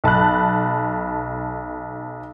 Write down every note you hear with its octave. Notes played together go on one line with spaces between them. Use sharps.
B1 A5 B5 F#6